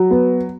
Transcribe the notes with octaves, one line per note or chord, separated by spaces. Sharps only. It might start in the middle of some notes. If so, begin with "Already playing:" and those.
Already playing: F#3
B3